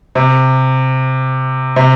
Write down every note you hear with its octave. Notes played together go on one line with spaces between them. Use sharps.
C3
C3